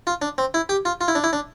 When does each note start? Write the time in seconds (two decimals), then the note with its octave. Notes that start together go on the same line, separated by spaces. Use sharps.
0.07 F4
0.22 D4
0.38 C4
0.54 E4
0.69 G4
0.85 F4
1.01 F4
1.08 E4
1.15 D4
1.24 E4
1.33 D4